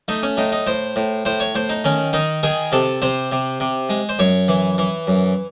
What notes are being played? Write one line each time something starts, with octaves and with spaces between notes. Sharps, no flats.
A3 D#4
C#4
A2 D#4
D#4
A2 C5
A2
A2 C5
C#5
A2 C5
D#4
D#3 C#4
D#3 D#4
D#3 G#4
C3 A4
C3 C5
C3
C3
G#3
C5
F#2 C#5
E3
E3
F#2